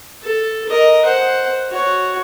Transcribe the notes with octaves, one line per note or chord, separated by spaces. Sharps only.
A4
A#4 D#5
C5 F#5
F#4 C#5